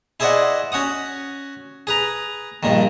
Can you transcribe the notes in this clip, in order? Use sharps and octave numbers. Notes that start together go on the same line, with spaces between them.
E4 G#4 C5 D5 D#5 F#5
C#4 F#4 F#5 D#6
G#4 B4 A#5
A#1 G2 A#2 D#3